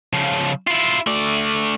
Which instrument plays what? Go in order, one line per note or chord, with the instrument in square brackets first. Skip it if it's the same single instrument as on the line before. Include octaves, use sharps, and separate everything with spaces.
[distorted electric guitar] C#3 F3
E4 F4
A3 D5